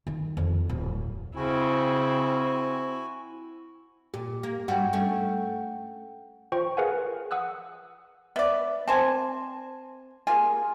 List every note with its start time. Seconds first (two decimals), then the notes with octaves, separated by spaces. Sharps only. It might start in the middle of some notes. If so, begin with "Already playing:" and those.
0.07 D#3
0.37 F2
0.69 D1
1.36 C#3 C4 E4 F#4 G#5
4.14 A#2 G4
4.43 A#3
4.68 G2 G3 F#4 F#5 G5
4.93 A3 C#4
6.52 F4 C5 G5 C#6
6.77 G#4 A#4 B4 F5 F#5 G#5
7.31 F#5 D#6 E6 F#6
8.36 B3 D5 E5
8.88 C4 C5 G#5 A5
10.27 A#3 F4 G#4 G#5